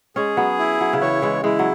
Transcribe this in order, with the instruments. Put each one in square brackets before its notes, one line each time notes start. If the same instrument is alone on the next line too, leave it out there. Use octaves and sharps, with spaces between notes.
[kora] G#3 C#4 [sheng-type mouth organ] G#4
[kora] F#3 B3
[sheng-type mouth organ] E4
[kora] F#3
C#3
[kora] E3 [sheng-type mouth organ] C#5
[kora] E3 G#3
[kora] E3 G#3 [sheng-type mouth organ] E4
[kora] F#3